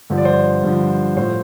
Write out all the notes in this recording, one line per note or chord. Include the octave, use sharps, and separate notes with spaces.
G2 D3 F3
D5
C5
D5
G2 D3 F3
A2 F3 C5